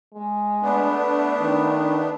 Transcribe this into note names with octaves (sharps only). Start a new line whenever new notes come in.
G#3
A3 B3 D4
D#3